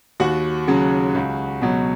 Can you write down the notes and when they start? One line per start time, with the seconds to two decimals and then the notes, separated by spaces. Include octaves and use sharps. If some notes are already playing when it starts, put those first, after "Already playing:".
0.20 D#2 F#4 F#5
0.68 C#3 F#3
1.15 C#2
1.61 B2 F#3